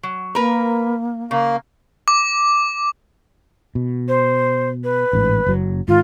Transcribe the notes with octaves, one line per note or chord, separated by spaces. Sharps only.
F#3
A#3 A#4 B4
C#3 A#3
D6
B2
C5
B4
A1 G#2
F#1 F#3
G#2 D#3 F4